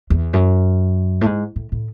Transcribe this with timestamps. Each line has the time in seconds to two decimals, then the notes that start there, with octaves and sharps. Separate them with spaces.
0.10 E2
0.33 F#2
1.21 A2
1.26 G#2
1.56 A2
1.72 A2